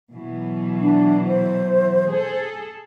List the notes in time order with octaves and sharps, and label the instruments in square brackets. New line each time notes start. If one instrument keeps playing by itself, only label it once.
[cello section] B2 E3 F#3
[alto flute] D4
C5
[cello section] G#4 A4